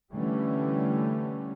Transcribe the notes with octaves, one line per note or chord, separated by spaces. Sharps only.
D3 E3 G3 A3 C#4